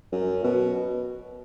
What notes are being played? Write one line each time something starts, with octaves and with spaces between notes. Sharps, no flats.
F#2
B2